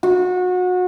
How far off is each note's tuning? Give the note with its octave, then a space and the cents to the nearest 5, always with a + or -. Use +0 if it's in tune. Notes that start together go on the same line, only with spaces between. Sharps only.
F#4 -30